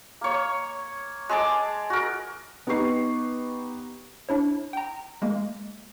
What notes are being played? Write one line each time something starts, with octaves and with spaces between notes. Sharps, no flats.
A#3 C#5
G#3 G#4 A5 D6
F#4 A#4
B3 D#4 G4 C#6 C7
D4 E4 C#5
G5 A#5
G#3 A#3